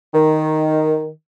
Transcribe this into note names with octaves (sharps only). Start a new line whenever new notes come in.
D#3